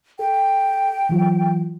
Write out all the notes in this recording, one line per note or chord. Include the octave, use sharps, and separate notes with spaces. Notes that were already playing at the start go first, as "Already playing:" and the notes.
A4 G5
E3 F#3 F4